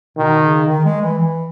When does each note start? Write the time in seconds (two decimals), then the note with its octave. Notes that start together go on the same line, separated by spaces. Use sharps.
0.17 B2 D#3
0.43 C#3
0.68 D#3
0.85 G#3
1.02 E3
1.19 E3